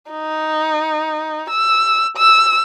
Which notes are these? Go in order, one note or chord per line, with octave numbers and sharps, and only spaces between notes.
D#4
E6
E6